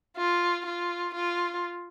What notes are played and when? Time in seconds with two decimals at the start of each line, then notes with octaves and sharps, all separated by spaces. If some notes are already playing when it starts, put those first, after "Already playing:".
0.17 F4
0.66 F4
1.15 F4